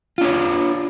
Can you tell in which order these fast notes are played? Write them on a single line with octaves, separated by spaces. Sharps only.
F4 D4 C#5